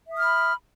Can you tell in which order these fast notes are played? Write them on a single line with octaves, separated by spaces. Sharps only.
E5 D#6 F6 B5